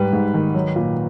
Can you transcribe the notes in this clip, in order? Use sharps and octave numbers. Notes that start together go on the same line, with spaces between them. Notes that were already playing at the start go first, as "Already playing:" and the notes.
Already playing: G#2 G3 B4
G#2
D#3
F#3
A#2